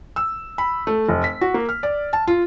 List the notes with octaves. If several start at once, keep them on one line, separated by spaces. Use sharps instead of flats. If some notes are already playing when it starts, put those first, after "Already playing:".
E6
B5
A3
F1
B6
F#4
A#3
F6
D5
A5
F4